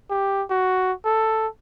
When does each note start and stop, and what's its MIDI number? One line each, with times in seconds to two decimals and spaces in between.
0.10 0.43 67
0.50 0.92 66
1.05 1.47 69